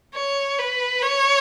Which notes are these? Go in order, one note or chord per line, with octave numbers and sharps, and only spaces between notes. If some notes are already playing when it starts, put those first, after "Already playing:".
C#5
B4
C#5